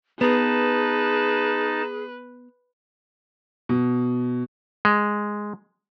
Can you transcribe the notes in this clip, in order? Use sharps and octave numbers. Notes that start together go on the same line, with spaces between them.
B3 D#4 G#4 B4 A5
B2
G#3